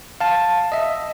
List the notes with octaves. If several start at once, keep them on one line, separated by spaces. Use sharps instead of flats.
F5 A5
D#5 E5